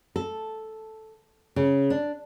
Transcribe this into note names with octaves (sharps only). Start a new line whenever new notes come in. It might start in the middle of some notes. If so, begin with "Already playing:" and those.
A4
C#3
D4